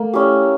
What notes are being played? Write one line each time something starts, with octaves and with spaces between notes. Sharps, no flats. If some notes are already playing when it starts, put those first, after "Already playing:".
Already playing: A3 A#3
C#4 E4 G4